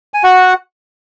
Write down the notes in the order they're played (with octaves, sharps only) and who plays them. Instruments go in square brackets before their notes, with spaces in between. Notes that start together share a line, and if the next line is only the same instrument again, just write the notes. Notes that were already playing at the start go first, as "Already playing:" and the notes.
[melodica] G#5
F#4 F#5